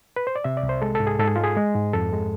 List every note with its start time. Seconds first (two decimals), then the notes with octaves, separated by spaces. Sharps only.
0.16 B4
0.27 C5
0.36 D5
0.44 C3 E5
0.57 D5
0.63 C2
0.69 C5
0.82 G#3 A4
0.95 G#2 A4
1.07 G#4
1.19 G#2 A4
1.28 G#4
1.36 G#3 F4
1.44 G#4
1.56 G#3
1.75 G#2
1.93 F2 A4
2.12 G#3